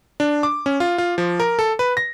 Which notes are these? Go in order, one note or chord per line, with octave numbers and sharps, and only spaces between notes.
D4
D6
C#4
F4
F4
F3
A#4
A4
B4
A#6